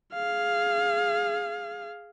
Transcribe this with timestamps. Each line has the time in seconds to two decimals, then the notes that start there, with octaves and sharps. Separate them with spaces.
0.14 G#4 F5